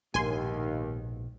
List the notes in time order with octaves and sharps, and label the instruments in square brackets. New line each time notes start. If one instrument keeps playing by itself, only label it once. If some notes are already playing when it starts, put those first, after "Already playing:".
[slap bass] A#1 G#2 B2 [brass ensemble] D#2 [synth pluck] G#5 C6